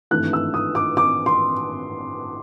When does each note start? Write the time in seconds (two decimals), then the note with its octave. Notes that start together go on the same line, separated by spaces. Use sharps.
0.11 G#1 G2 E3 A3 F#6
0.33 E6
0.54 D#6
0.75 D6
0.97 D6
1.26 C6